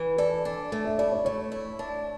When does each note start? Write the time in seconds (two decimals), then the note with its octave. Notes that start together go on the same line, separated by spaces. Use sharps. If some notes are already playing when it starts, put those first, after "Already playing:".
Already playing: E3
0.18 A4 D5
0.45 D4
0.72 A3
0.85 E5
0.98 E4 D5
1.12 C#5
1.25 A3 C#5
1.52 E4
1.79 D4